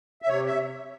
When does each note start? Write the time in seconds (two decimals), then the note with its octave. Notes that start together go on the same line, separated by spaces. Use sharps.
0.22 E5
0.28 C3 C#5
0.46 E5